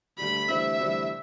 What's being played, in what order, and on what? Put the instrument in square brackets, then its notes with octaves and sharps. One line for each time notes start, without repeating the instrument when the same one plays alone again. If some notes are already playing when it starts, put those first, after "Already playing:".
[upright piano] D2 D3 G3 [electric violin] B5
[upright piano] D2 C3 E3 G3 C4 [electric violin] E5
[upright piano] D2 C3 E3 G3 C4